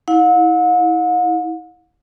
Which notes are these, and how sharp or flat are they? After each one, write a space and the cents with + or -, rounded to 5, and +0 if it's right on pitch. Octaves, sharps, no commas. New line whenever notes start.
E4 -25 F#5 -45